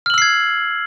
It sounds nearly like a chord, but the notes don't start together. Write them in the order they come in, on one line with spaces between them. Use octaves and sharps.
F6 F#7 E6 C7 G#6